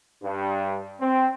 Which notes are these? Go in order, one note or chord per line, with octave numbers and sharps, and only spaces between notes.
G2
C4